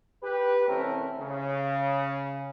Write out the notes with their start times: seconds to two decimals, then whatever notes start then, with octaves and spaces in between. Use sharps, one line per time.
0.23 G4 B4
0.68 C2 E3 A3 C4 C#4 A#4
1.20 C#3